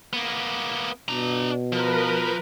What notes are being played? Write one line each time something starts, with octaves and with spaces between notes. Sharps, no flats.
A#3 B3
B2 D4 A#5
F3 A#4 B4